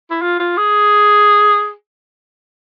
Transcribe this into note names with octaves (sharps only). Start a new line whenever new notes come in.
E4
F4
F4
G#4